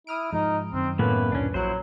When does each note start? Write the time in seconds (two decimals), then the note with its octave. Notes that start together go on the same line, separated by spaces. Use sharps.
0.07 E4 D#6 F6 D7
0.33 G#2 F3 G#3 D#4
0.73 F#2 D#3 C4
0.99 A2 A#3 B3 C#4 B4
1.32 D2 A#2 C#4 D4
1.54 A#1 F#3 E4 F#4 C5 F#5